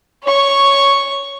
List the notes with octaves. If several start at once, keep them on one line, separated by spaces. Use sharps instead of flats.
C#5 C#6